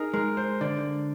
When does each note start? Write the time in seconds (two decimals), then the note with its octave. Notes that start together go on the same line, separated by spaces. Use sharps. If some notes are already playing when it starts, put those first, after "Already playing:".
Already playing: D#4 G#4 A#4
0.14 G#3 A#4
0.37 C5
0.61 D3 D5